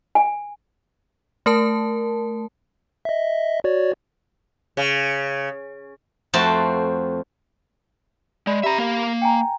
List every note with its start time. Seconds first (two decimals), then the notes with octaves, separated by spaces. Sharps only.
0.15 G#5
1.46 A3 A#4 A5
3.05 D#5 E5
3.64 F#4 C#5 D5
4.77 C#3
6.33 F2 A3 C4 F#4 A5
8.47 G#3 D5 B5
8.63 G4 E5 A#5 B5
8.78 A#3 F5
9.22 G5 G#5 A#5